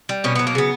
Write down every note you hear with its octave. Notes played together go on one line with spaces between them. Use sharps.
G3
B2 C#4
F#3 B3
A#3
C#3 B3